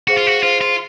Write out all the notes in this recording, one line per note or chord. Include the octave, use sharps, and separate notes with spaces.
F#4 G#4 C5 F5
F4
F#4
F4 G#4 C5 F5
F4